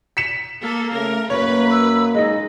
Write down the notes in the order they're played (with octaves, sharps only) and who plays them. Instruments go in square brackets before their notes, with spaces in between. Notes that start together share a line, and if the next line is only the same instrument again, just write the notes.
[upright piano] B6 C#7 E7
[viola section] A#3 A4
[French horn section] C#3 A3 [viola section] A#4
[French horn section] F#2 A#3 [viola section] B4 [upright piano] C#5
[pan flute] E6
[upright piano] G#3 D#4 [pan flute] D#5